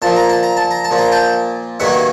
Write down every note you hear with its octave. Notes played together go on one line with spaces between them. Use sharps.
A#2 F3 A#3 A5
A#5
A5
A#5
A5
A#5
A5
A#2 F3 A#3
A#5
G5 A5
G2 D#3 F#3 A#3 E5 F#5